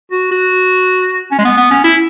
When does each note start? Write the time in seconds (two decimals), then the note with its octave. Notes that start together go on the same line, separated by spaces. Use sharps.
0.11 F#4
0.31 F#4
1.31 C#4
1.39 G#3
1.45 B3
1.57 B3
1.71 C#4
1.84 E4